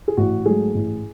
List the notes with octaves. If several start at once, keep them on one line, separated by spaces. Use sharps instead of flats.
G#4
A1 F#4
G#2 F#3 A3 G#4
A1